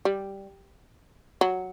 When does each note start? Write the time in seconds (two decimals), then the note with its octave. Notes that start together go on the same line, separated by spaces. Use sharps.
0.05 G3
1.41 F#3